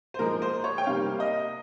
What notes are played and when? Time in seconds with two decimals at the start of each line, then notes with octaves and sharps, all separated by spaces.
0.14 C5
0.19 A#2 F3 G#3 A#4
0.42 C5
0.64 C#5
0.78 G5
0.87 C3 G3 A#3 F5
1.20 D#5